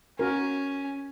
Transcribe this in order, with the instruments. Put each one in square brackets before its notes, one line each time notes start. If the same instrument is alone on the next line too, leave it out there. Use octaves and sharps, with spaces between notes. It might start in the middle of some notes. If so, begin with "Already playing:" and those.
[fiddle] C#4 [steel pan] F#4 A#4